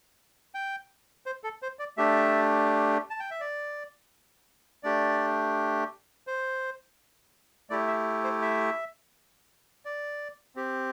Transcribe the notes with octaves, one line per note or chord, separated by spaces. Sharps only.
G5
C5
A4
C5
D5
A3 D4 G4 E5
A5
G5
E5
D5
A3 D4 G4 D5
C5
A3 E4 G4 D5
E5
C5
E5
D5
C4 G4